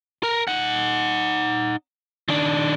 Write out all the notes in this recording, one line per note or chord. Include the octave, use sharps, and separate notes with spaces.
A#4
D#4 F#5
D#3 D4